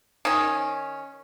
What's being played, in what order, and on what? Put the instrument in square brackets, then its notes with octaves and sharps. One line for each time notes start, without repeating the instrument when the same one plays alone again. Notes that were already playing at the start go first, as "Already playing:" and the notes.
[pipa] D#3 C#4